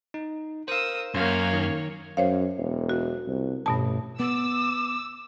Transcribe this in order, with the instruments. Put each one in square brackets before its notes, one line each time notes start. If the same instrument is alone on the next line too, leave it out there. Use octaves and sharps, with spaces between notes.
[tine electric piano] D#4
[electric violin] A#4 [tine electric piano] C5 F5 [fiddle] D#6 E6
[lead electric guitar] F#2 [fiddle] A#3 F5 [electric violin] A#4 C#5 [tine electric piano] C6 F6
[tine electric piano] D#3
[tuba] F#2 [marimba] C5 C#5 F5
[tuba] E1
[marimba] F#4
[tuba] C2
[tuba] A1 [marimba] G2 B2 A5
[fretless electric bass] B3 [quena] D6 [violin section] E6